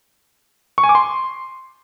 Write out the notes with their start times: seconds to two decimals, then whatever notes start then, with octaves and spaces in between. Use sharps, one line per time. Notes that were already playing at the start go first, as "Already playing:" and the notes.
0.78 C#6
0.84 G#5
0.89 D6
0.95 C6